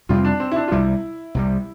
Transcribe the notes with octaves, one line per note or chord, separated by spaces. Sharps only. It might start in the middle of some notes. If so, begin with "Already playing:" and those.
F2 C3 G3 C4 F4
D4
C4
E4
D4
F4
C2 C3 G3 E4
C2 C3 G3